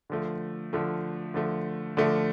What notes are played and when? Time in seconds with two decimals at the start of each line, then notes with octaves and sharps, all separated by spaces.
0.10 D3 F3 A3
0.73 D3 F3 A3
1.34 D3 F3 A3
1.97 D3 F3 A3